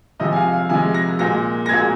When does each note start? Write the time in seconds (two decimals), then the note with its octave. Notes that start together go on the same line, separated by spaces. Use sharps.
0.20 C3 F3 G#3 D#5
0.32 G#5
0.36 F5
0.53 F5
0.69 C3 F3 G#3 G#5
0.94 A#6
1.19 A#2 G#3 A#6
1.66 A#6
1.69 A#2 G#3 G#6